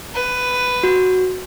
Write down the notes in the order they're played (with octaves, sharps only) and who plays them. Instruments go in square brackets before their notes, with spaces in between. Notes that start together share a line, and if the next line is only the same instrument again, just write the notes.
[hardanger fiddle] B4
[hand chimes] F#4